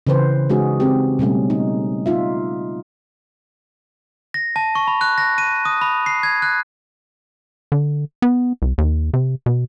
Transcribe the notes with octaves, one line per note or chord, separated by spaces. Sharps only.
C#3 E3 B4 C5
G#3 C#4 D#4 F#4 G#4
C4 G4
B2 G3 A3 C#4
D#4
D#4 F4 E5
A#6
A5
C#6
B5
F#6
A#6
D#7
D#6
B5
C7
G#6
F#6
D3
B3
C2
D#2
C3
B2